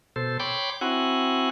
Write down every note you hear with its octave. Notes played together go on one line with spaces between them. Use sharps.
B2 A4 C5
C#5 G5 B5 C6 D6
C4 E4 F#4 F#5 G#5